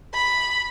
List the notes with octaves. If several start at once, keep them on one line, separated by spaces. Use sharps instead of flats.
B5